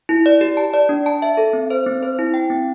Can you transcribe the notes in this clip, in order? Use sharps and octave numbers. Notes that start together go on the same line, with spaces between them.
E4
D5
G4
A5
D5
D4
A5
E5
A4
C4
C5
C4
C5
E4
G5
C4